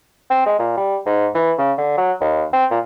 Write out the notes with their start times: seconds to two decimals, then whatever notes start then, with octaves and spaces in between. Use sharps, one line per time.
0.30 C4
0.46 G#3
0.59 A#2
0.77 G3
1.06 G#2
1.34 E3
1.58 C#3
1.78 D3
1.97 F#3
2.21 D#2
2.53 C4
2.71 A#2